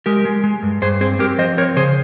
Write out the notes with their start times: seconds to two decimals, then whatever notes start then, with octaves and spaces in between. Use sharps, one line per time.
0.06 G#3 G4 A#4
0.25 G#3
0.44 G#3
0.63 G2
0.82 G2 G#4 C5
1.01 C4 G#4 C5
1.19 C4 G4 A#4
1.38 F3 C5 D#5
1.57 C4 A#4 C#5
1.76 C#3 G#4 C5